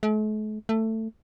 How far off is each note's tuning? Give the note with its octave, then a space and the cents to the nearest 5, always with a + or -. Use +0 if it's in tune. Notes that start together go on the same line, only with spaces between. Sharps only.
A3 -45
A3 +15